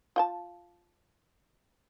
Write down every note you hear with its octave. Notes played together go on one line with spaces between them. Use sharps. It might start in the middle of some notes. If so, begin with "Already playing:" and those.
F4 G5 A5